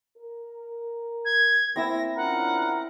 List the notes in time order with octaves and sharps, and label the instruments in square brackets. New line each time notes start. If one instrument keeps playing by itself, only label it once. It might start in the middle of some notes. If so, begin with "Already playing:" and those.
[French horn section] A#4
[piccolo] G#6
[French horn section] A#3 [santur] C4 E4 E6 [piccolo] A#6
[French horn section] C#4 D4 F4 [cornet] A#4 [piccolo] F#5